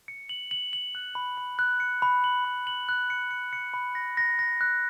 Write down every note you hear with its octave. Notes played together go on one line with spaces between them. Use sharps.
C#7
F#7
F#7
F#7
F#6
B5
B5
F#6
C#7
B5
F#7
B5
F#7
F#6
C#7
C#7
C#7
B5
A#6
A#6
A#6
F#6